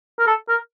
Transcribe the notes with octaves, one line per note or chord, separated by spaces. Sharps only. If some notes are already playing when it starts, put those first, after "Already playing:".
A#4
A4
A#4